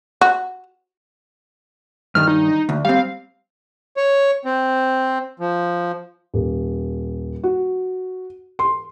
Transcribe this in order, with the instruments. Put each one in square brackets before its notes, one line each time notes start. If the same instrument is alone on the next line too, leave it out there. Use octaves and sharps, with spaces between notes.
[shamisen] F#4
[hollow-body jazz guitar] G2 D#3 [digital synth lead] F6
[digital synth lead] D#4
[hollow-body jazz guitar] D2
[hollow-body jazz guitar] G3 C4 [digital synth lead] F5
[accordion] C#5
C4
F3
[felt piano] D#1
F#4
C6